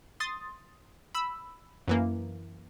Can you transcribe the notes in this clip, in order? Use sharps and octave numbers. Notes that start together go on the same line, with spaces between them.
C6 D#6 A6
B5 E6
F#2 E3 A#3